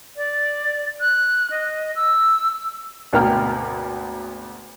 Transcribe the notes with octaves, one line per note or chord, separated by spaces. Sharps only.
D5
F#6
D#5
E6
G#1 D2 B2 A#4 G5 F6